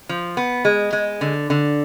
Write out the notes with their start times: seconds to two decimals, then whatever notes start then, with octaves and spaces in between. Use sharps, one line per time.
0.09 F3
0.37 B3
0.65 G#3
0.93 G#3
1.21 D3
1.50 D3